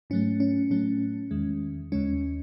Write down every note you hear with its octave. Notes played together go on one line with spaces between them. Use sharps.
G#2 F#3 A3 C#4
C#4
A2 F#3 A3 C#4
E2 D#3 G#3
D#2 C#3 G#3 C#4